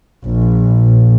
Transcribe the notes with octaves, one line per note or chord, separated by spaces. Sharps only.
A#1